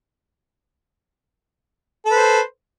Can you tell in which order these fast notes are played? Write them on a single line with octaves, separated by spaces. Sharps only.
A4 B4 C5